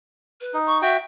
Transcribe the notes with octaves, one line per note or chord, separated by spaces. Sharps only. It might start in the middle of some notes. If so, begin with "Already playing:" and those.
B4
D#4
C#6
F#4 E5 G5